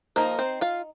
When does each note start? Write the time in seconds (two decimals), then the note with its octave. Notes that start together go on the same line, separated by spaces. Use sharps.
0.16 F3 A#3 D#4 A#4
0.39 C4 C5
0.61 F4 F5